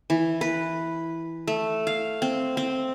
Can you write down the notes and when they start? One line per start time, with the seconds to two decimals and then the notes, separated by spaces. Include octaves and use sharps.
0.10 E3
0.41 B4
1.47 A3
1.87 F5
2.22 C4
2.57 C4